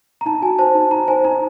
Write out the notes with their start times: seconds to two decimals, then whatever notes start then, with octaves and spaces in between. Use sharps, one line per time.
0.21 A#5
0.26 D#4 A5
0.42 F#4 G#5
0.59 C5 A5
0.75 D#4
0.91 D#4 A#5
1.08 C5 G#5
1.24 D#4 A#5